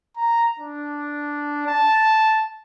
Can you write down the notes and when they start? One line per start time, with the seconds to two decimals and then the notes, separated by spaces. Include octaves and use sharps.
0.17 A#5
0.59 D4
1.67 A5